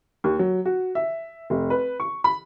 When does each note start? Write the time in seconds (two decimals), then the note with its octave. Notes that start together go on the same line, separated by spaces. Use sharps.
0.24 D#2
0.39 F#3
0.65 F#4
0.95 E5
1.50 F1
1.70 B4
2.00 C#6
2.24 B5